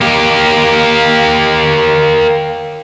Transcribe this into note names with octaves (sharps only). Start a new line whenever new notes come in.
A#3 G4